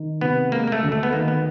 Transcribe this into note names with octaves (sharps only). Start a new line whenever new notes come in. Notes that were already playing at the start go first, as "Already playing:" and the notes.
Already playing: D#3
C3 B3
G#3 A#3
A#3
A3
D2
A3
B3
D#3 A#3
B3